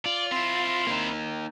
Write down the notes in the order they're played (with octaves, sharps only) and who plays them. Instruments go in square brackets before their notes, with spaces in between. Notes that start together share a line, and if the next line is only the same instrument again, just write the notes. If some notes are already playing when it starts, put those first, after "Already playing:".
[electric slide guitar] F4 [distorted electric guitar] D5
[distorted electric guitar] C4 E4 [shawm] C6
[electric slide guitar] A#3 D#4